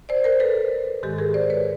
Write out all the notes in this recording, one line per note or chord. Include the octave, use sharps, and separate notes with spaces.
C5 D5
A#4 C5
A4 B4
G#2 D#3 G#3 G4 A4
G#4 A#4
C5 D5
B4 C#5